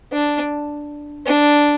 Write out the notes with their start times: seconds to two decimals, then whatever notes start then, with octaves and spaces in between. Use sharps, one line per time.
0.12 D4
1.27 D4